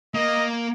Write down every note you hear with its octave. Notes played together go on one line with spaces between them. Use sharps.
A#3 D#5